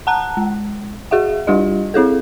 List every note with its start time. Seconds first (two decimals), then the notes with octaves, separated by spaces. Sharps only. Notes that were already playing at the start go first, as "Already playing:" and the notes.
0.07 F#5 A5 A#5 F#6
0.37 G#3
1.11 F#4 G#4 E5 F#5
1.47 G3 D4 F4 G4 D#5
1.94 C4 E4 G#4 A4